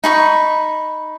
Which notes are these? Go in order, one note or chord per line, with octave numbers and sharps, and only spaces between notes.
D#4 B5 C#6